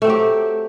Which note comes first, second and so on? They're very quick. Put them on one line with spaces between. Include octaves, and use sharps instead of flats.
A3 C4 F#3 G4